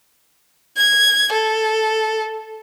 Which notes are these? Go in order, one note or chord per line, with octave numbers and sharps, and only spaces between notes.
G#6
A4